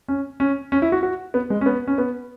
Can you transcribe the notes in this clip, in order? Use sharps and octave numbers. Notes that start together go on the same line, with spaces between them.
C#4
C#4
C#4
E4
F#4
F#4
B3
G#3
C#4
B3
C#4
B3